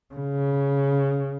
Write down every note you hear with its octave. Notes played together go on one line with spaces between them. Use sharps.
C#3